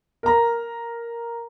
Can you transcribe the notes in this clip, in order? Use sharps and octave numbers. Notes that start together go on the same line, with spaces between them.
A#4 A#5